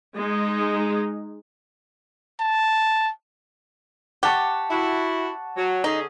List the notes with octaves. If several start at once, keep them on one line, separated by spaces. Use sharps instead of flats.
G#3 D#4
A5
G4 F#5 A5 C#6
E4 F#4
F#3
D3 C#4 D#4 G#4